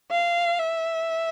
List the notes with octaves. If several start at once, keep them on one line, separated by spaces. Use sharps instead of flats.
F5
E5